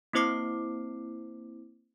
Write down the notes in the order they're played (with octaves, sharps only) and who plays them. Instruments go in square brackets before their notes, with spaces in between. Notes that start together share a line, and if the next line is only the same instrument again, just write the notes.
[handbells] A#3 C4 E4 C5 D6 C7